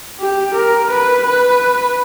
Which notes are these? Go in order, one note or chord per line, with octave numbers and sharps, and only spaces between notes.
G4
A#4
B4
B4